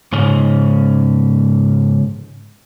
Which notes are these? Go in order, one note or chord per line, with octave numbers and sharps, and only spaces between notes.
G#2 C#3 C#4